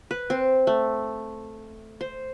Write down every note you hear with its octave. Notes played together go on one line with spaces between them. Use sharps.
B4
C4
A3
C5